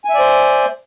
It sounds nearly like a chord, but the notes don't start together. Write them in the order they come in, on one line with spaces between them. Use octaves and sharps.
G#5 E5 D5 C5